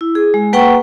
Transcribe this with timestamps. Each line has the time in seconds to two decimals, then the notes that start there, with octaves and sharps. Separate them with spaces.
0.01 E4
0.15 G#4
0.34 G#3
0.53 A#3 B4 F#5 G5 A#5 C#6